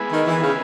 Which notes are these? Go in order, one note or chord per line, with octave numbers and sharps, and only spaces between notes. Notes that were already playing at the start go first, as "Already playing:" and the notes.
Already playing: G#3 B3 E4 G#4 B4
D#3
E3
C#3